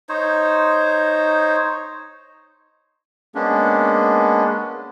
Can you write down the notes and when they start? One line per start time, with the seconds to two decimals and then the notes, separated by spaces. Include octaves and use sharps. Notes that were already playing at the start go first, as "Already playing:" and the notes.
0.09 D#4 C5 C#5
3.35 G#3 A#3 B3 C#4 D4